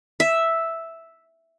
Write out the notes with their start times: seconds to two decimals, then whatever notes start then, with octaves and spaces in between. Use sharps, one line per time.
0.20 E5